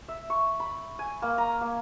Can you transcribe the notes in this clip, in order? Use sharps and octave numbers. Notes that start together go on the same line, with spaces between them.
E5
C#6
B5
G#5
A#3
A#5
A#3